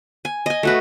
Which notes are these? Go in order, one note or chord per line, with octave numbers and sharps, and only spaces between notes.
G#5
D#5 G#5
A3 F#4 B4